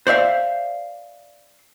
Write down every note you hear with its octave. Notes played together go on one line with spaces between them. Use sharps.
C5 D5 E5 F5